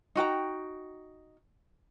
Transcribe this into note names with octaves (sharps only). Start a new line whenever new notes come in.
D#4 F#4 G5 A#5